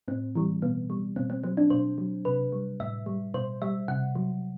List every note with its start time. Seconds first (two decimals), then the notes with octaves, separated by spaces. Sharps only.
0.08 A2 C4
0.35 E3 G3
0.62 B2 B3
0.90 G3
1.16 B2 C4
1.30 C4
1.44 F#3 C4
1.57 D4
1.70 B2 C5
1.98 F#3
2.25 C3 B4
2.52 G3
2.80 A2 E5
3.06 G3
3.34 B2 C5
3.62 G3 E5
3.88 C3 F#5
4.15 F#3